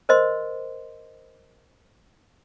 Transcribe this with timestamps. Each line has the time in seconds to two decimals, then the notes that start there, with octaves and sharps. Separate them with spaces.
0.09 A#4 C5 D#5 C6